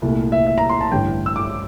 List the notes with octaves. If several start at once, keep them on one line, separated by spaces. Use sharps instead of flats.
C2 A#2 A3
E5
E5
A#5
C6
A5
A1 G2 D3 G5
E6
D6